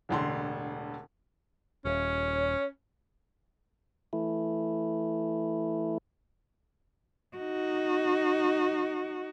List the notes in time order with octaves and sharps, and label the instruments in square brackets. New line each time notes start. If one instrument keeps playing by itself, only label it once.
[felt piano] E1 A1 D3 C6
[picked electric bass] D#1 [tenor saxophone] C#4 [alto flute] C#5
[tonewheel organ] E3 A3 E4
[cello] D#4 F#4